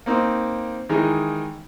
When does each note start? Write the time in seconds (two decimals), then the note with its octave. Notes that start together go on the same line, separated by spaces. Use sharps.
0.06 A#3 C4 D#4
0.89 D#3 E3 G#3 D#4